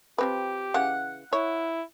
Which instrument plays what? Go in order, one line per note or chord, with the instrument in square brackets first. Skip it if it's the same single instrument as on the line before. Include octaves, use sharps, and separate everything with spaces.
[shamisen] F3 C4 B4 [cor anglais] G4
[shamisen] C#3 E3 [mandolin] F#5
[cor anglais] E4 [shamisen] C#5